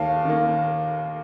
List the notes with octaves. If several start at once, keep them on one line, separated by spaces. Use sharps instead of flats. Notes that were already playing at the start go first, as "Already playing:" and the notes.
Already playing: D#2 F5 A5
D#3 A#3